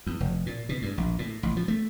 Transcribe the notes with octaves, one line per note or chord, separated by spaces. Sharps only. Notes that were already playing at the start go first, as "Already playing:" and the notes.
E2
F1
A#2
B2
G2
A#1
A2
A1
F3
A3